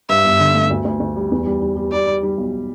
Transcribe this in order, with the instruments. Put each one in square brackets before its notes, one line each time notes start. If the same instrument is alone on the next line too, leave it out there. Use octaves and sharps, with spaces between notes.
[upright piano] G2 [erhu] E5
[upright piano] G1
D3
A3
D2
D2
D2
G3
E2
G3
G3
G3
[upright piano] G3 [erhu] D5
[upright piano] G3
G3
B1